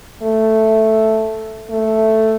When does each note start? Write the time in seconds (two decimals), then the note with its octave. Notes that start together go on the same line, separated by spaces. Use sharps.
0.22 A3
1.70 A3